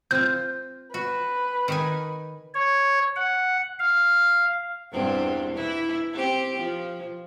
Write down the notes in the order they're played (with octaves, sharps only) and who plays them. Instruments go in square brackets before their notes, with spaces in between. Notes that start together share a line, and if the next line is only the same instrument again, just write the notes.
[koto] C4 F4 [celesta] G6
[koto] F#4 [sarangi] B4
[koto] D#3 D#4 G#5
[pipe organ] C#5
F#5
F5
[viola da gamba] E2 G2 C4
E3 E4
C4 G4
F3